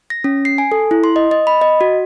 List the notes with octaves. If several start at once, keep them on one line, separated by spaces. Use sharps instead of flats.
A#6
C#4
C7
G#5
A4
E4
C6
D#5
D#5
B5
D#5
F#4